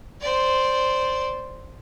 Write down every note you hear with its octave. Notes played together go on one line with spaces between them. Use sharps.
C5 D5